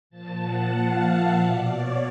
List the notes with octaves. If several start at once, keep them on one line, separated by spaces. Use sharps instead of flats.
A#2 F3 A5
F#5
F5
E5
B2 D5
C#5